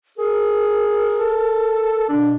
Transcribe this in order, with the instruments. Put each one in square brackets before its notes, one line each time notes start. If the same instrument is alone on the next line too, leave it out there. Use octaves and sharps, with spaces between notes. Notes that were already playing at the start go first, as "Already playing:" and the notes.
[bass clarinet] G#4 [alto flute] A#4
[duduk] A4
[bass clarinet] B2 [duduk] D4